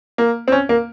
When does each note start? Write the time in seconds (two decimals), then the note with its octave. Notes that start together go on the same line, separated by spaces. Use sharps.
0.18 A#3
0.48 C4
0.52 C#4
0.69 A#3